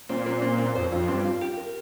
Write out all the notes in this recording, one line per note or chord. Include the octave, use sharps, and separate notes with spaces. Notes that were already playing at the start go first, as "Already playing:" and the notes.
A#2 C4
C4
C4
C4
F2 C5
F2 F4
G2 C4
F4
G4
A#4